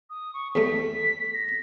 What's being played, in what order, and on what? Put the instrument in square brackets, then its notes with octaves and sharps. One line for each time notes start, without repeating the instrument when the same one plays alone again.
[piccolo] D#6
C#6
[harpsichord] E2 G3 A3 [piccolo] B6
[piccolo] A#6